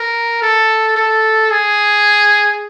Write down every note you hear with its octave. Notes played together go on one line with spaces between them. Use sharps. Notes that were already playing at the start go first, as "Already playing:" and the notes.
Already playing: A#4
A4
A4
G#4